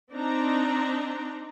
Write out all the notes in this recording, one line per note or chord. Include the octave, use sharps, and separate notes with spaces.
C4 D4 D#4 A#5